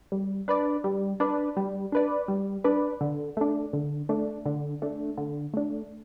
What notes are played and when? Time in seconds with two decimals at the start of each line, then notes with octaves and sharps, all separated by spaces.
0.12 G3
0.48 D4 B4 D5
0.84 G3
1.20 D4 B4 D5
1.57 G3
1.92 D4 B4 D5
2.28 G3
2.64 D4 B4 D5
3.01 D3
3.37 A3 D4
3.73 D3
4.09 A3 D4
4.46 D3
4.82 A3 D4
5.18 D3
5.54 A3 D4